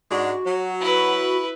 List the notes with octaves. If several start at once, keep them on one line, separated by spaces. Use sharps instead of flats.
G#2 G#3 D4 F#4
F#3
E4 B4